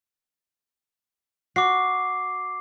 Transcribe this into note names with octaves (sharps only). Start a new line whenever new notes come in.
F#4 D6 C7